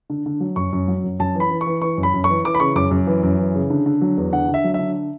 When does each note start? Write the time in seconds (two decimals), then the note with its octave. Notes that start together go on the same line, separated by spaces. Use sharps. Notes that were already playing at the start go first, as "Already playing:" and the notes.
0.10 D3
0.26 D3
0.40 F#3
0.56 F#2 C#6
0.73 F#2
0.88 F#3
1.04 F#2
1.19 F#2 A5
1.35 E3
1.40 B5
1.51 E3
1.61 C#6
1.67 E3
1.82 E3 C#6
1.98 F#2
2.03 B5
2.14 F#2
2.24 C#6
2.29 E3
2.44 E3 D6
2.55 B5
2.60 C#3 C#6
2.76 F#2 D6
2.91 F#2
3.07 E3
3.23 F#2
3.38 E3
3.55 C#3
3.70 D3
3.86 D3
4.01 F#3
4.17 E2
4.32 D3 F#5
4.49 D3
4.54 E5
4.64 F#3
4.74 E5
4.79 D3